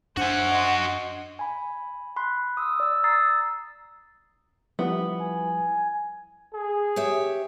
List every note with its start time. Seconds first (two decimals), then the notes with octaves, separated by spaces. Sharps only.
0.17 F#2 D4 F#4 C5 E5 F#5 G#5
0.51 D#5 C6
1.39 G#5 B5
2.16 B5 C6 F#6
2.57 D#6 E6
2.80 D5 E6
3.04 A#5 D#6 E6 A6 C7
4.79 F3 G3 B3 E4
5.21 G#5
6.53 G#4
6.96 G4 C#5 E5